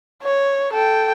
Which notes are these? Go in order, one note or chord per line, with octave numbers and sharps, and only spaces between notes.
C#5
A4 G5